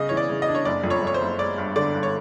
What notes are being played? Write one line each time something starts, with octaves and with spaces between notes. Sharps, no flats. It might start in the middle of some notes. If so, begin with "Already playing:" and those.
Already playing: C#3 D#5
E3 C#5
D5
C#3
D#5
D4
C#5
F#1 D5
F2
C#5
F2 C#5
C5
F#1
G#3 D5
G2
D3 D5
G2
C#5